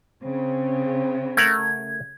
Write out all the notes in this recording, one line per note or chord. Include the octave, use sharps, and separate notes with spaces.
C#3 C4
A3 A#4 F#5 G#6